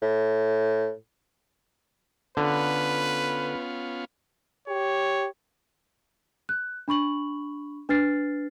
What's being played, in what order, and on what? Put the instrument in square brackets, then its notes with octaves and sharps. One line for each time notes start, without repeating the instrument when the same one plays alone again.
[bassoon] A2
[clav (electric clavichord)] D3 [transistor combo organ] B3 C#4 F4 [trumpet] B4
[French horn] G4 [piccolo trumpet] C#5
[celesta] F#6
D4 B5 C#6 F#7
D4 B4 F6 A6 C7